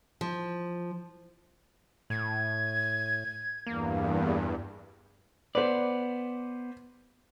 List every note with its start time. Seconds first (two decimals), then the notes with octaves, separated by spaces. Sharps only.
0.21 F3
2.10 A2 G#6
3.67 E2 G2 A#3
5.55 B3 B4 C5 D5